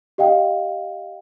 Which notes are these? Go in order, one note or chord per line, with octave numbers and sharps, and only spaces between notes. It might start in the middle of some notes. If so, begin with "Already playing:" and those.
G4 D#5 F5 G5